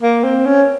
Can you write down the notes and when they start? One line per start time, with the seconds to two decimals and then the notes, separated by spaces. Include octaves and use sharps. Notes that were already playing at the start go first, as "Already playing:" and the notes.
0.02 A#3
0.24 C4
0.45 C#4